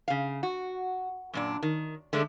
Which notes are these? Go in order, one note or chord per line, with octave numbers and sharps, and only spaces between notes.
C#3 F5
F#4
F#2 A#2 D4
D#3
D3 G#3 A3 D4